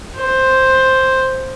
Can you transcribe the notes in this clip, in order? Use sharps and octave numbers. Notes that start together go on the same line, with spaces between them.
C5